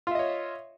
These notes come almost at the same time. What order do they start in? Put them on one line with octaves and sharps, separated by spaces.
F4 E5 D#5 C#5